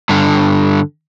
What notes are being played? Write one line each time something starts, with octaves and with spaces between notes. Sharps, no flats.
G2 D3